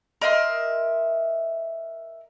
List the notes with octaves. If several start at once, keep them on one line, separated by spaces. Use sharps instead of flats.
A#4 D#5 E5 C6